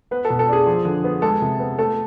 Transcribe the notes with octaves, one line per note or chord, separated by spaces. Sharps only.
B3 B4
A4
B2
A4
D4 G#4
F3
D3
B3
G#3 A4
C3
B3
A3 A4